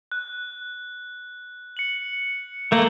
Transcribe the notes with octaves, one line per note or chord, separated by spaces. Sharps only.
F#6
C#7 F#7
A3 A#3 D7 F#7 G7